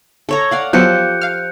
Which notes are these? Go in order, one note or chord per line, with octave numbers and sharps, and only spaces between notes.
A4 C#5 A#5
D5 F5 F#5
F3 F#3 B3 G4 A4 F#6 G6 C#7
F5 F6